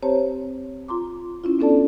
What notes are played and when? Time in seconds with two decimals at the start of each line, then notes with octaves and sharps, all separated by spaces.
0.03 C4 G4 C5 C#5 A5 A#5
0.88 F4 A#5 C6 D6
1.44 C#4 E4 F4
1.59 B3 C#4 D4 A4 D5 A5